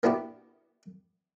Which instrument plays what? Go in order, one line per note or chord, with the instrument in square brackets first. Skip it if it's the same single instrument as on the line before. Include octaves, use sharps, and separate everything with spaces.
[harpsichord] A#3 B3 D4 E4 F#4 G4